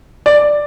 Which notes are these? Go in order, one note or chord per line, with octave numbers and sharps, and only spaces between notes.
D5